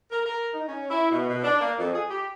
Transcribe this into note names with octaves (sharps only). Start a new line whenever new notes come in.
A#4
A#4
D#4
C#4
E4
B2
B2
D4
A#3
F2
G#4
G4